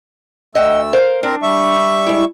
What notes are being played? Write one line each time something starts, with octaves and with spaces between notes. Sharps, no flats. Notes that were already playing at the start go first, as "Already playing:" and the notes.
D2 A3 D#5 F#5 G5 E6
A#4 C5 F5
C4 D4 A#4
G3 E5 C#6
G#3 E4